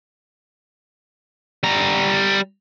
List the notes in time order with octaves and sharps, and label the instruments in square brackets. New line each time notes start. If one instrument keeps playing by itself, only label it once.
[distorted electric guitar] G3 A#5